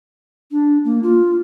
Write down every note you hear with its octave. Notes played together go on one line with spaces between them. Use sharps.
D4
A#3
F4